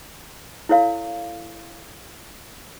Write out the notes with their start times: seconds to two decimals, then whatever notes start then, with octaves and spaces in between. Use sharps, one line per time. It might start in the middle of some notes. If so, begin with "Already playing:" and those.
0.69 E4 A4 C#5 F5